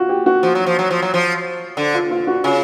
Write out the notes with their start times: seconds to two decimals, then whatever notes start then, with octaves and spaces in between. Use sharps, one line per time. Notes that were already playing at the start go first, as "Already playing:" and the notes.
Already playing: F4 F#4
0.09 G4
0.26 F#4
0.43 F3
0.55 F#3
0.66 F3
0.79 F#3
0.91 F3
1.02 F#3
1.14 F3
1.77 D3
1.94 F4
2.11 F4
2.27 F#4
2.44 C#3 F4